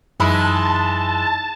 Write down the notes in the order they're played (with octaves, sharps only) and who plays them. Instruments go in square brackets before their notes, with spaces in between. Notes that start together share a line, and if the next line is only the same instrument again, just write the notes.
[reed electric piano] F#2 [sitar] E3 G#3 E4 [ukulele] D#4 B5 [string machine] A5